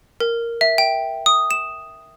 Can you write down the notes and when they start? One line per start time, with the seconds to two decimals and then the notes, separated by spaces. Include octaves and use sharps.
0.20 A#4
0.61 E5
0.78 G5
1.26 D#6
1.51 E7